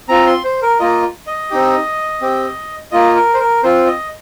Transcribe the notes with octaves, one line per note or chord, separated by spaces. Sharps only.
C4 F4 A#5
C6
C5
A#4
A#3 F4 D#5
D#5
C4 D#4 G4
C4 G4
A#3 F4 D#5
A#4
C5
A#4
C4 F4 C5
D#5